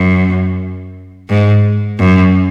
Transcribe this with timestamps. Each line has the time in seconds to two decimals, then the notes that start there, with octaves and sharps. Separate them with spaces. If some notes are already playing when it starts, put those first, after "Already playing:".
Already playing: F#2
1.29 G#2
1.99 F#2